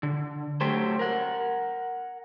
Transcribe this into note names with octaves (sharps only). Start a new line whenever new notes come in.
D3
F#3 A3 G4 C5
A#4 F#5